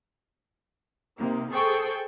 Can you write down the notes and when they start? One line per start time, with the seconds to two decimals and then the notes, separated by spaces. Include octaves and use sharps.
1.19 C3 A#3 D#4
1.51 G#4 A4 C5 G5 C#6